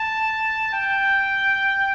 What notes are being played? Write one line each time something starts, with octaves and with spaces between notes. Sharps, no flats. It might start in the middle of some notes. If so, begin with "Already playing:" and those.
Already playing: A5
G5